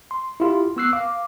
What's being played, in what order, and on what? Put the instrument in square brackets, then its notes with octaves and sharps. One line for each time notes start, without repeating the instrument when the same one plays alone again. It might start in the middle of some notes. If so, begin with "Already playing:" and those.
[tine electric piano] C6
E4 F4 G4
B3 C#6 E6 F#6 C7
F5 D6